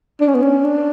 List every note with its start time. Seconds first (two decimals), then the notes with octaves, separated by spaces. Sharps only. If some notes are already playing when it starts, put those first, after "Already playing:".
0.21 D4
0.28 C#4
0.35 B3
0.42 C#4
0.65 D4